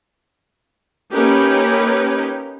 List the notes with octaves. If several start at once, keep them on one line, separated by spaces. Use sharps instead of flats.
A#3 C#4 D#4 G4 A#4 B4